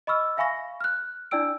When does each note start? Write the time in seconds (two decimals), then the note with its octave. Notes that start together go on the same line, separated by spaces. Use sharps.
0.07 D#5 B5 C#6 E6 F6
0.37 E5 F5 G#5 B5 C#6 A#6
0.81 F6 F#6
1.31 D4 E4 D5 G5 E6 D7